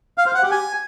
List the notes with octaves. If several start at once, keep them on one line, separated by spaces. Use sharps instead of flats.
F5
C5
F#5
G4
G#5